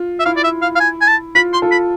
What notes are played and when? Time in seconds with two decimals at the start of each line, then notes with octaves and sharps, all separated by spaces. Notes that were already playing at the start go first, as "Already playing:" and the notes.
Already playing: F4
0.20 E5
0.25 E4 F5
0.37 D5
0.43 E5
0.62 F5
0.76 F5
0.80 G#5
1.01 G#5
1.07 A5
1.35 F4 B5
1.53 C6
1.62 F4 A4
1.71 B5